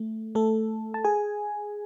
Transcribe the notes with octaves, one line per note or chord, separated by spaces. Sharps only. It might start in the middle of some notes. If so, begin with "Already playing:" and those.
Already playing: A3
A3 A4
A5
G#4 G#5